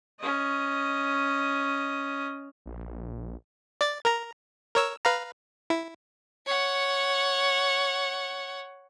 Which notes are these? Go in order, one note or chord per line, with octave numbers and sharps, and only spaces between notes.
C#4 D#5
A#1
D5 A6
A#4 A#5
A#4 C#5 E6
B4 F5 A#5
E4
C#5 F#5